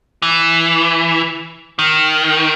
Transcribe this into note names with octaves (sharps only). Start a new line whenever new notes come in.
E3
D#3